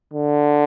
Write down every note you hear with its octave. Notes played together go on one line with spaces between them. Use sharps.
D3